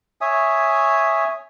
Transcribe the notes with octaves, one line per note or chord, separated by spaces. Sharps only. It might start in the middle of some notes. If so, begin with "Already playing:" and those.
C#5 E5 G#5 D#6